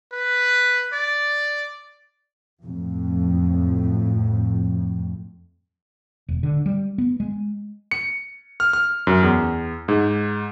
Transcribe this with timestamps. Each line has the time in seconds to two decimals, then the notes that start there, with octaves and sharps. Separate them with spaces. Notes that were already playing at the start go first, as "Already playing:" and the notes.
0.13 B4
0.93 D5
2.63 F2 A2
6.28 E1
6.43 D3
6.66 G3
6.98 B3
7.20 G#3
7.91 C#7
8.60 F6
8.73 F6
9.07 F#2
9.23 E2
9.88 G#2